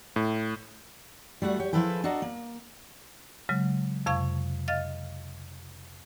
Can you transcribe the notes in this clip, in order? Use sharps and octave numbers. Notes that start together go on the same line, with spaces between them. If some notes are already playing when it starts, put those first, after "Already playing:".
A2
G3 A3 F#4 F#5
G4 C#5
F3 E4 G#4 A4 B4 G5
D4 F#4 A4 D#5 A#5
A#3
C#3 F#3 G#3
F2 C3 F5 C#6 G#6
D#5 F5 F6 A6